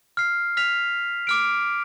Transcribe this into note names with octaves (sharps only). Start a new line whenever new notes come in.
F6 C7
F6 B6 F7
D6 F6 D7